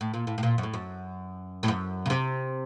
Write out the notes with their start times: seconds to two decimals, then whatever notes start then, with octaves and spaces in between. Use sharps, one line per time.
0.01 A2
0.14 A#2
0.27 A2
0.38 A2
0.43 A#2
0.58 F#2
0.63 A2
0.74 F#2
1.63 A2
1.68 F#2
2.06 C#3
2.10 C3